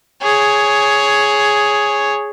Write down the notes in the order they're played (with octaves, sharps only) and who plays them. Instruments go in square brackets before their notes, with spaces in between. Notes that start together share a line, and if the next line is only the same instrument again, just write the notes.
[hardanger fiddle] G#4 C#5